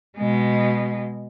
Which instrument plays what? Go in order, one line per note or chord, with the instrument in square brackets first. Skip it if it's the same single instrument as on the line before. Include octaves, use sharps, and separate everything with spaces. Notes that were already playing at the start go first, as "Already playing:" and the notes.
[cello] B2 G#3